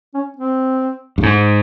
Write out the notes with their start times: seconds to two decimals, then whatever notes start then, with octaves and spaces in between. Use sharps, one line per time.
0.14 C#4
0.37 C4
1.18 G2
1.23 G#2